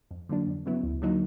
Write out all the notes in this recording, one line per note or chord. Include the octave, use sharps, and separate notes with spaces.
F2
D3 F#3 A#3 D4
F2
C#3 F#3 B3 E4
D2
D3 F#3 A#3 D#4